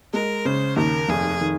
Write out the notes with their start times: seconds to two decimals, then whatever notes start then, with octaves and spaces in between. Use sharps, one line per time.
0.13 G#3 A#4
0.45 C#3 C5
0.77 D#2 A#4
1.09 F1 G#4
1.41 D#3